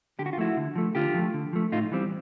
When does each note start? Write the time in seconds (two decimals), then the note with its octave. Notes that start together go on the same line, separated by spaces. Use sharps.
0.19 D3 G4
0.26 F#4
0.33 F4
0.37 F3 A3 E4 F#4
0.57 D3
0.76 F3 A3
0.95 D3 F4 G4
1.14 F3 A3
1.34 D3
1.53 F3 A3
1.72 A2 D#4 F4
1.91 E3 G3 C4